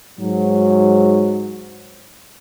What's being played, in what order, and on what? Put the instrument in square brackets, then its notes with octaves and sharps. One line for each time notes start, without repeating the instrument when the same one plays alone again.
[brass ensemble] G#2 F#3